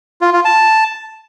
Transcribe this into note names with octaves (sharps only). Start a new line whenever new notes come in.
F4
F4
A5